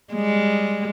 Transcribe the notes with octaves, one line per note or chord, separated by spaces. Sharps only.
G3 G#3